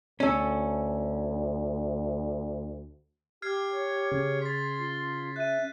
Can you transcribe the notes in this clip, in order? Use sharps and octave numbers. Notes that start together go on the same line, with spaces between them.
D2 C#4 A4
G4 F6 G#6 C7
C#5
C#3
C6 A6 B6
F4
E5 F#6 D#7